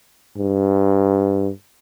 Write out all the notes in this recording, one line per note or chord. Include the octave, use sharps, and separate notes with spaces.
G2